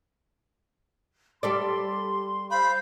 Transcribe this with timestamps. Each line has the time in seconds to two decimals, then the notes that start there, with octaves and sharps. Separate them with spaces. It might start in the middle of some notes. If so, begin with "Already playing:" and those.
1.43 G3 A4 D5 C6
2.51 C5 F5 B5 G6